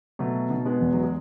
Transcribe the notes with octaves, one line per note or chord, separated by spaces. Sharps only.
B2 F#3 A3
B2
G#3 B3
E2
F#3
G#3